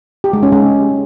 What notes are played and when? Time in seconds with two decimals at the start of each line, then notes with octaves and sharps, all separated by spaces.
0.24 G4
0.33 G#3
0.43 C#4
0.52 G#3